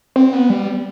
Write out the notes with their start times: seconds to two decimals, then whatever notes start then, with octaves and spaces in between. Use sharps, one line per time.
0.16 C4
0.33 B3
0.50 G3